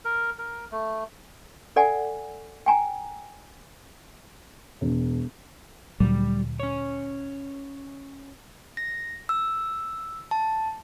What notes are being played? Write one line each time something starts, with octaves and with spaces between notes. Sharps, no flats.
A#4
A#4
A3
A4 D5 F#5 G#5
G5 G#5 A#5
E1
D2 A#2 F#3 G3
C#4 C#5
A#6
E6
A5